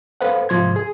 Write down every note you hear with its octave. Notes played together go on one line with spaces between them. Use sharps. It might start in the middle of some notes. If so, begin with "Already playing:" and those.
A4 B4 C5 F5 F#5
G#2 C3 F3 C6 G#6
G#4 G#5